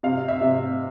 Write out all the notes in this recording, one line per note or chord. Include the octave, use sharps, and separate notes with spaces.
C3 F5
E5
C3